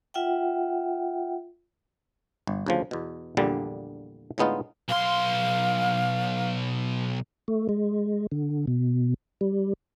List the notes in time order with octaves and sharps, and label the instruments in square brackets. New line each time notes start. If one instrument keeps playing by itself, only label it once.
[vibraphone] F4 E5 F#5 G5
[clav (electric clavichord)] G1
D2 C#3 F3
E2 B2
A#1 E2 A#2 D3 G3
A2 D3 G#3 B3 D#4 F4
[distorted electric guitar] B1 C6 [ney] F5
[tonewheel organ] A3
G#3
D3
B2
G3